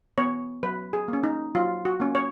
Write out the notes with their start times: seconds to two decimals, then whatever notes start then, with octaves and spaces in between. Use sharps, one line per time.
0.18 B3 C#5
0.63 F#3 B4
0.93 G#4
1.08 A#3
1.13 C#4
1.23 D#4
1.55 F#3 F4
1.85 F#4
2.00 A#3 C#4
2.15 C#5